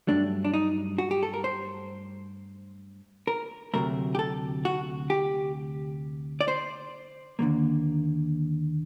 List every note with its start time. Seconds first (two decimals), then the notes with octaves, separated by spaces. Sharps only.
0.07 G2 F#3 A3 D4
0.45 D4
0.54 D#4
0.98 F#4
1.11 G4
1.23 A4
1.34 A#4
1.44 C5
3.27 A#4
3.74 D2 C3 F#3 A3 A#4
4.15 G4
4.19 A4
4.65 F#4
5.10 G4
6.41 D5
6.48 C5
7.39 D#2 D3 F#3 A#3